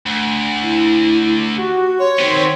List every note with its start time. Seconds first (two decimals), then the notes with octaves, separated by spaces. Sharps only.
0.06 D2
0.62 E4
1.56 F#4 G4
1.99 C#5 C6
2.19 D#3 B3 C4 C5